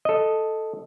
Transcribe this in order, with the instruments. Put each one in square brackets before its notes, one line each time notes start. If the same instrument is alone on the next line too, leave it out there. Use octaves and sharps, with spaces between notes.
[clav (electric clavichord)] A4 D#5